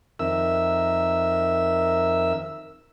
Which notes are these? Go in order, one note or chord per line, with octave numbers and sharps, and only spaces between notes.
F2 D#3 A#4 E5 E6